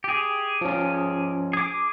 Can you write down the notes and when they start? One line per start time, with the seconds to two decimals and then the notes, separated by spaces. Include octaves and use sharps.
0.04 G4 G#4
0.61 F3 C#4
1.53 G#4 D6